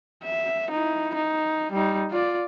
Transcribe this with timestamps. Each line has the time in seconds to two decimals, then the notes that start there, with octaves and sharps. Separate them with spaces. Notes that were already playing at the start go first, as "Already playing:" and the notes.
0.23 E5
0.71 D#4 E4
1.15 D#4
1.72 G3 D#4
2.11 F4 D5